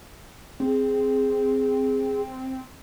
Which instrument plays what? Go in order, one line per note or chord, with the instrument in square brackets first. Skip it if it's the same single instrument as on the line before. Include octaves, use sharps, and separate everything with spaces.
[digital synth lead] C4 [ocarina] G#4